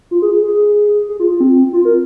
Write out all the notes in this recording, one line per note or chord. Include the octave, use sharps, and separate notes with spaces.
F4
G#4
G#4
G#4
F4
F4
C4
F4
A#4